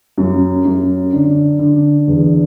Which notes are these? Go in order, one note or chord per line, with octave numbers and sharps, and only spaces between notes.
F#2
F#2
D3
D3
E2